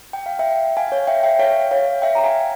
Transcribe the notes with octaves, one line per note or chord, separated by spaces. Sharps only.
G5
F5
E5 G5
F5 G#5
C#5 F5
E5 G5
E5 G5
C#5 F5
C#5 F5
E5 G5
A#5
F5 G#5